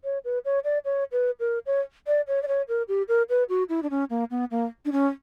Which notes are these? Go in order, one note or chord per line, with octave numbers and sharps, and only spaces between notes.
C#5
B4
C#5
D5
C#5
B4
A#4
C#5
D5
C#5
D5
C#5
A#4
G4
A#4
B4
F#4
E4
D4
C#4
A#3
B3
A#3
D4
C#4